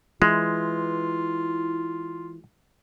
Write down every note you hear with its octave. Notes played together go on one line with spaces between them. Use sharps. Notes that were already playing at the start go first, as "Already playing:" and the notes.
E3 G#3 F4